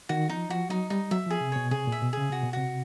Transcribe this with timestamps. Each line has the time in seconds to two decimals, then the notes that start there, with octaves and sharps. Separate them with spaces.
0.09 D#3 F#4
0.29 F3 D#4
0.50 F3 F#4
0.70 F#3 D#4
0.90 G3 D#4
1.11 F#3 E5
1.26 F3 G#4
1.41 C3
1.52 B2 C#5
1.71 C3 G#4
1.87 A#2
1.92 E5
2.02 B2
2.13 C#3 G#4
2.30 C3 F#4
2.44 B2
2.53 C3 F#4